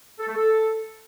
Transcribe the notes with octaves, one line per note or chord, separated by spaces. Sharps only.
A4
A3
A4